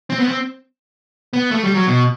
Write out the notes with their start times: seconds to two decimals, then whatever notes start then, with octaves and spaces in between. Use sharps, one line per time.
0.10 C4
0.19 B3
0.28 C4
1.33 B3
1.51 A3
1.64 G3
1.75 F#3
1.87 B2